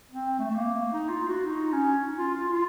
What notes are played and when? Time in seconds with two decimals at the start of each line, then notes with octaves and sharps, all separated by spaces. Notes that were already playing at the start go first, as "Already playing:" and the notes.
0.11 C4
0.39 A3
0.51 A3
0.56 A#3
0.93 D#4
1.09 F4
1.28 F#4
1.46 D#4
1.72 C#4
2.17 F4
2.35 F4
2.53 F4